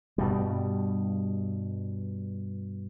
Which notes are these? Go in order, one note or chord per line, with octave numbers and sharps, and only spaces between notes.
G2 B2 G3